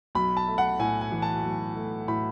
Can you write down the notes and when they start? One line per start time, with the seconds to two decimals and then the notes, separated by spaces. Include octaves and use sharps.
0.15 B1 B5
0.37 A5
0.47 A3
0.58 F#5
0.79 A2 G#5
1.01 G#5
1.12 E3
1.22 A5
1.44 B1
1.76 A3
2.08 A2 B5